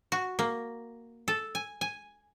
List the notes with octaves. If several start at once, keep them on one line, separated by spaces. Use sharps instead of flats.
F#4
A#3
A4
G#5
G#5